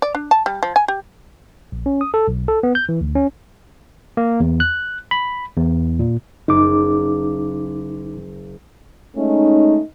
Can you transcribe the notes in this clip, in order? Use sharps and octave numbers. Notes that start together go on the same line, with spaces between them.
D5
D4
A5
G3
F3
G#5
G4
A#1
C#4
D#6
A4
B1
A4
B3
G6
E3
D2
C#4
A#3
E2
F#6
B5
E2
A#2
F#1 D#4 D6
G#3 A3 C#4 D#4